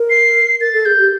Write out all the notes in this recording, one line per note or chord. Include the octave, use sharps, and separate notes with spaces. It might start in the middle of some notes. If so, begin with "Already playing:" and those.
Already playing: A#4
C7
A#4 A6
A4
G#4 G6
G4